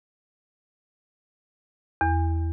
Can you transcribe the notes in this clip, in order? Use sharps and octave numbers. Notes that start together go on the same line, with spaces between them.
E2